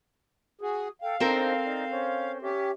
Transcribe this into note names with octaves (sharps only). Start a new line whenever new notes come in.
F#4 G#4 D#6
A4 F5 G5
C4 D4 D#4 A4 A#4 C5
D#4 D5
C#4 C5
C#4 G4 E5